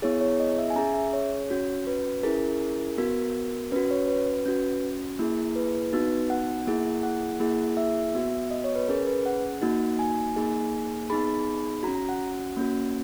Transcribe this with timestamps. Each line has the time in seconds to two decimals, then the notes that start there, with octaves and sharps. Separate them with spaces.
0.02 B3 E4 G#4 C#5
0.21 C#5
0.40 D#5
0.58 E5
0.70 G#5
0.76 C#4 G#4 A#5
0.94 E5
1.13 C#5
1.50 C#4 F#4
1.87 B4
2.23 C#4 E4 G#4 A#4
2.98 B3 F#4 A#4
3.72 C#4 F#4 B4
3.91 C#5
4.08 B4
4.46 C#4 F#4
5.19 A#3 E4 G#4
5.56 B4
5.93 B3 D#4 F#4
6.30 F#5
6.67 A#3 E4 G#4
7.03 F#5
7.40 A#3 E4 G#4
7.77 E5
8.15 B3 F#4
8.51 D#5
8.64 C#5
8.76 B4
8.88 C#4 G#4 A#4
9.07 B4
9.26 F#5
9.62 A#3 D#4 F#4
9.99 G#5
10.36 A#3 D#4 G#4
11.10 B3 D#4 G#4 B5
11.83 F#4 A#5
11.88 C#4
11.95 A#5
12.09 F#5
12.57 A#3 C#4 F#4